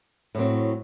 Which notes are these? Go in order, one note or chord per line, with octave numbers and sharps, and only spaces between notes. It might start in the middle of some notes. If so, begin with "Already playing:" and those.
A2 F#3 C4